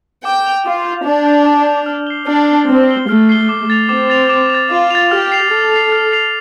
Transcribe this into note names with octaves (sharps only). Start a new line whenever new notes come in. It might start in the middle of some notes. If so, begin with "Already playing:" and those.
G5 D6
G6 F7
F4 D6
G6 F7
D4 D6
G6 F7
D6
G6 F7
F6
C7 G7
D4 F6
C7 G7
C4 F6
C7 G7
A3 F6
C7 G7
D6
A6 F7
C4 D6
A6 F7
D6
A6 F7
F4 D6
A6 F7
G4 F6
C7 F7
A4 F6
C7 F7
F6
C7 F7